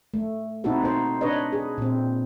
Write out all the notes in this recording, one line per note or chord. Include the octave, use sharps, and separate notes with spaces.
A3
B2 C4 D#4 E4 F#4 A4
A#3 D#4 C5
D4 B4 C#5 D#5
G#4
A#2 C4